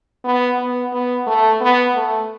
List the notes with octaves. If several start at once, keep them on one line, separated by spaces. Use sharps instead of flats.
B3
B3
B3
A3
B3
A3